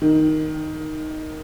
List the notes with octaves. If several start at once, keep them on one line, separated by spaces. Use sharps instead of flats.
D#3